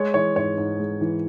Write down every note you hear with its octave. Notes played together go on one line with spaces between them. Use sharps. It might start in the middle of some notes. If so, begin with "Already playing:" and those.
Already playing: G#3 C#5
E3 C#5
G#2 C#5
G#2
G#3
E3